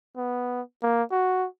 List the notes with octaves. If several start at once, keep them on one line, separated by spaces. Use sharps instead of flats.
B3
A#3
F#4